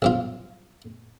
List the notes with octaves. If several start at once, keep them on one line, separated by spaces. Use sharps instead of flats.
B1 G2 F4